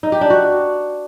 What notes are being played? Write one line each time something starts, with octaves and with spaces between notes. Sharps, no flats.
D#4
G4
D4
F#4